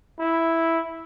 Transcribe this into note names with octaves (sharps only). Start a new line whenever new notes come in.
E4